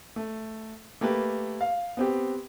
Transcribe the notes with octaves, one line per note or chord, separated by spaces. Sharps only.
A3
A3 A#3 G4 B4
F5
B3 C4 G4